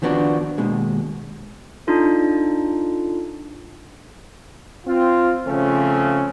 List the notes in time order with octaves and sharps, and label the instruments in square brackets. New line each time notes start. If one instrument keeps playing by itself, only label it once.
[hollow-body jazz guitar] D#3 F3 B3 D4 F#4
D#2 B2 G#3
[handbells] D4 D#4 F4 A4
[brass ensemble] C4 F4
C#3 F3 A3 C4 C#4